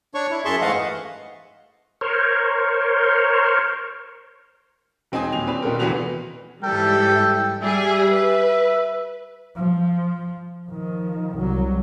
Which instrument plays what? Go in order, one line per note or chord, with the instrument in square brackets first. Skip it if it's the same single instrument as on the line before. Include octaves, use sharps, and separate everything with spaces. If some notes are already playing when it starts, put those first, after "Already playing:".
[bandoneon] D4 C#5 C#6
E4
F#2 G#4 E5 A5 C6 C#6
G#2 E3 A3 D#5 F5 F#5
[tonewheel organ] A#4 C5 C#5
[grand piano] E1 C4 D#4 G#5 D#6
D#1 G#5 F7
C4 D4 B4
B2 B3 C4 G4 A4 A#4
F1 A#2 E3 B3 F#4 F7
[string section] G#2 E3 G3 [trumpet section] A4 G5
[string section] G3 G#4 [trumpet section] E5
[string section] B4
[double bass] F3
D#3 F3
C2 F#3